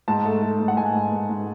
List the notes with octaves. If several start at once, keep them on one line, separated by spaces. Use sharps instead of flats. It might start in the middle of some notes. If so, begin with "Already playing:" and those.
G#2 A5
A3
A3
G#2
F#5
G#2 G#5
G#2
G#2
G#2